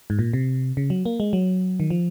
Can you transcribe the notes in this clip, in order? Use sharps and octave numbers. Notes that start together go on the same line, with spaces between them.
G#2
A#2
C3
C#3
F#3
A#3
G#3
F#3
D#3
F3